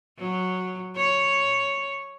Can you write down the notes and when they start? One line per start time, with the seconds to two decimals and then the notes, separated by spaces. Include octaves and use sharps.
0.18 F#3
0.96 C#5